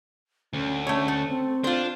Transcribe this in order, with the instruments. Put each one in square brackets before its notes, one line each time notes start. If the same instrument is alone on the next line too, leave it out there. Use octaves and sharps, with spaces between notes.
[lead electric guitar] D2 [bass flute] C#4
[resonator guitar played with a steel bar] A3 C#5 [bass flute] C#4
[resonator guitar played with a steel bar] A3
[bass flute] C4
[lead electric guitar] D4 [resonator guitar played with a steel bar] F4 C5